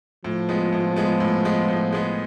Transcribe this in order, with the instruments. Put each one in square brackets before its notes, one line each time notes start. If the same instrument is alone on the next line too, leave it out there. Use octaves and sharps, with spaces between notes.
[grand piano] A2 [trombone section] F3
[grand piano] G#3 B3
A2
G#3 B3
A2
G#3 B3
A2
G#3 B3